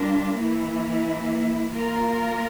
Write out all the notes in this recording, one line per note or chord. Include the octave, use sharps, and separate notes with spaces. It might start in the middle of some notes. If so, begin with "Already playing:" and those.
Already playing: G3 D4 F4 A#4
E3 A#3 E4
A#3 F4 A#4